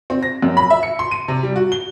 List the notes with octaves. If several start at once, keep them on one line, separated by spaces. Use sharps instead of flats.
C4
A#6
F#2
B5
E5
C#7
C6
D#7
C3
G3
F#4
G7